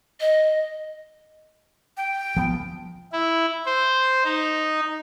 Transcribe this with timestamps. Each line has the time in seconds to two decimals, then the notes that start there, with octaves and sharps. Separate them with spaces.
0.21 D#5
1.97 G5
2.37 F3 B3
3.12 E4
3.66 C5
4.24 D#4